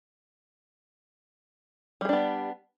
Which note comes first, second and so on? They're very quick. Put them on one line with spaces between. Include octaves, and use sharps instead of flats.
G3 G#4 D4 B3